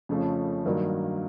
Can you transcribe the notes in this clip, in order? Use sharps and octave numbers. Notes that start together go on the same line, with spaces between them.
F2 C#3 F3 A3 C#4
G2 D#3 F#3 A#3